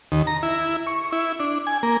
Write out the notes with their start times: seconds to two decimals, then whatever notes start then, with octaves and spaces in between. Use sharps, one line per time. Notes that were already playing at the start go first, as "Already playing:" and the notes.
0.12 D#2
0.27 A#5
0.43 E4
0.87 C#6
1.12 E4
1.40 D4
1.67 G#5
1.83 A#3